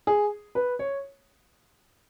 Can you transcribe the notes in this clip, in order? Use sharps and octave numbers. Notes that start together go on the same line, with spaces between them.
G#4
B4
C#5